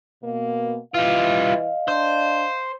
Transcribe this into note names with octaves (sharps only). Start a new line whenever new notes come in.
B2 A#3
E3 G3 F4 D#5 F5
D4 C5